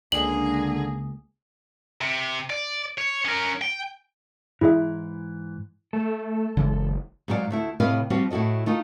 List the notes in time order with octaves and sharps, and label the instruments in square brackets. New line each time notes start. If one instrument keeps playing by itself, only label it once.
[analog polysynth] C#2 [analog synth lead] D3 [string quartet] A#3 G#4 [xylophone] F#7
[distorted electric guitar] C3
D5
C#5
C#4 A#4
G5
[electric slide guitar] G#2 E3 [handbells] E4 G#4 E5
[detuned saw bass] A3 [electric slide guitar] A4
[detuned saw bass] F#1 [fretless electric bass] C#3 E3 G#3
[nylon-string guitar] G#2 F#3 G#4 A4 D5 F5
D2 A3 E4
A2 C3 B4 D#5 F5
F3 G3 C4 F4 F#4
A2 E4 F#4 A4 D#5
A3 D#4 F4 A4